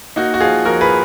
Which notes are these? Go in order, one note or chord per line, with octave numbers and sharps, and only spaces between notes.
A#3 D#4 F#4
F#4
F3 F4 G#4
F2 F#4 A#4
G#4 B4